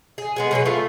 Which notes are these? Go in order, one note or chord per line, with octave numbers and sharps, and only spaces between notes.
G#4
G#3 B3 G#4
B2 F#3 A4 B4
A3 F4